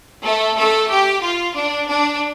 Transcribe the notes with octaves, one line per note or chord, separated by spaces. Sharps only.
A3 A4
A3 A4
G4
F4
D4
D4